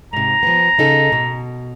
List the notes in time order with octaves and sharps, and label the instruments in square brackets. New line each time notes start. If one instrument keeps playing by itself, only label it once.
[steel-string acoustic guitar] G#2 C3 [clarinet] A#5
[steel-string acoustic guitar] F3 B3
C#3 D#4 A4
B2